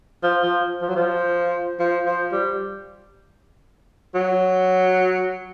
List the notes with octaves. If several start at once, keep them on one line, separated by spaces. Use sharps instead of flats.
F3
F3
F3
F#3
F3
F3
F3
G3
F#3